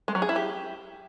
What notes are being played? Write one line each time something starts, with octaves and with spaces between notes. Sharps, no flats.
G#3
F#3
G#4
E4
G4